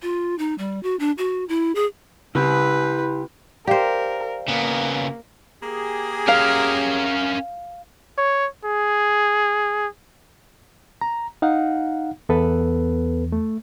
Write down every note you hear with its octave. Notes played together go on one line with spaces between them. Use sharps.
F4
D#4
G3
F#4
D4
F#4
E4
G#4
C#3 E4 G4 B4
G4 A#4 C5 D5 F5
C#3 A#3 B3
A#3 G4 G#4
C#4 A#4 F5
C#5
G#4
A#5
D#4 F5 F#5
E2 B3 A4 B4
A3